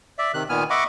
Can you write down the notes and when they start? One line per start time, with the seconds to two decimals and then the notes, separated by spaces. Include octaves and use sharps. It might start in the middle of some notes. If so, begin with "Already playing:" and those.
0.18 D5 E5
0.34 C3 D#3 F#6
0.49 A#2 D#3 B3 G#5 F6
0.70 D#5 E5 F#5 B5 C#6 D6